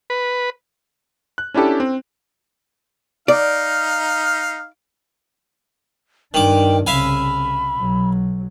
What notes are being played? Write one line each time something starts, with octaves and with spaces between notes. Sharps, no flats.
B4
F#6
C#4 D4 E4 G4 A4
C4
D#4 D5 F5
G2 D#3 D4 G5 D6
C2 C#3 E5 F5 G#5 B5
B1 F#3